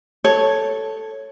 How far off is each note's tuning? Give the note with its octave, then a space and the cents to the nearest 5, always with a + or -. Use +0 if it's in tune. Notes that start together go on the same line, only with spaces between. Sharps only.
A4 +0 C#5 +0